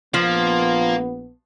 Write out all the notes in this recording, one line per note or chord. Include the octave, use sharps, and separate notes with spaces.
A#1 F3 A#3 B3